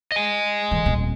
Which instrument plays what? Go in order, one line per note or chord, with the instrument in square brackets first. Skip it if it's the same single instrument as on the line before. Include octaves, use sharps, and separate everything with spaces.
[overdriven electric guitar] D#5 G#5
[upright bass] D3 E3
D#1 C4